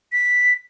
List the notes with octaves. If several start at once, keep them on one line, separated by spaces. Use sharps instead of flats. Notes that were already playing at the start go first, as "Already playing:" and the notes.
B6